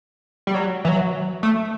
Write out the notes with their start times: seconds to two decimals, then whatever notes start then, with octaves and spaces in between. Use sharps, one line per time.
0.47 G3
0.54 F#3
0.85 E3
0.89 F#3
1.43 A3